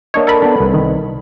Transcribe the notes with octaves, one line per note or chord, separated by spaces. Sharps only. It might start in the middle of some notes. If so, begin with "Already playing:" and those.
A#3 D4 C#5 D#5
A4 A#4 B5
B3 D4
C2 B4
D#3